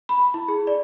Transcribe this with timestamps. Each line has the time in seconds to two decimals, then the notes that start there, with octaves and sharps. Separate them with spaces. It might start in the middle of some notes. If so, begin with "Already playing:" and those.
0.09 B5
0.34 E4
0.48 G#4
0.67 D5